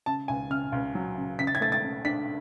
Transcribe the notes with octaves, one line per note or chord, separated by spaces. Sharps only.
C#3 A5
C#2 G#5
C#3 F6
C#2
F#3
C#3
C#3 B6
A6
G#6
A3 A6
A6
C#3
D4 B6